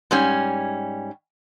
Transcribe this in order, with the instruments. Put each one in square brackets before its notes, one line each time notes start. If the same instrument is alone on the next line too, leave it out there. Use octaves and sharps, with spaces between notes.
[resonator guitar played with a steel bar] G#2 G3 C#4